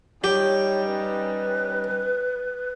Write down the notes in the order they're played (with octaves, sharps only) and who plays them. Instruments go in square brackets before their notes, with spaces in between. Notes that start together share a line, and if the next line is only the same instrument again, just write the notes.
[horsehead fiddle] G3 D#4 [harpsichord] G4 [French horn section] C#5
[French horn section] C#4 [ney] B4